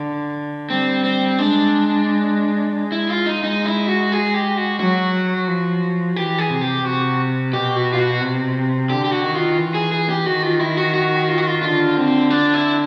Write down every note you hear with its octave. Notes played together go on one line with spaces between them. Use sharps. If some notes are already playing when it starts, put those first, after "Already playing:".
Already playing: D3
G3 C4
C4
G#3 D4
G#3
E4
F4
D#4
G#3 D#4
E4
F#4
G#4
G4
F#4
F#3 F#4
F3
E3 G4
G#4
C3
G4
C3 F#4
B2 G4
F#4
F4
F#4
C3
D3 G4
G4
F#4
D#3
F4
E3
G#4
G#4
G4
D#3 F#4
F4
E4
F#4
F#4
F4
F#4
F4
D3 F4
C4
D4
E4